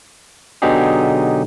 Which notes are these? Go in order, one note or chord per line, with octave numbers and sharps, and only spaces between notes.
B2 D3 F#3 D#4 G4 G#4